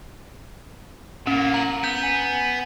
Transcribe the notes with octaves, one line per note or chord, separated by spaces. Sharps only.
A2 A#3 C#4
A#5 F#7
B3 G6
G#5